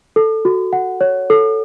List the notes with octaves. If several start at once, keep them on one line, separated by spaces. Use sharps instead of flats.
A4
F#4
F#5
C#5
A4